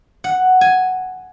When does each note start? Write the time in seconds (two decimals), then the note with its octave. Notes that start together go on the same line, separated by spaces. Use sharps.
0.24 F#5
0.61 G#5